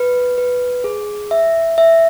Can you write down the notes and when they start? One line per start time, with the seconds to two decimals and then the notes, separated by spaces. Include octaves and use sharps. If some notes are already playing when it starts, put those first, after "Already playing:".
Already playing: B4
0.38 B4
0.84 G#4
1.31 E5
1.78 E5